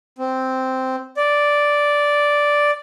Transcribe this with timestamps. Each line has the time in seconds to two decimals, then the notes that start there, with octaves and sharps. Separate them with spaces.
0.18 C4
1.17 D5